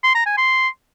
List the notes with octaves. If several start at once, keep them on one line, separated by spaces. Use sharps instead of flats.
C6
A#5
G#5
C6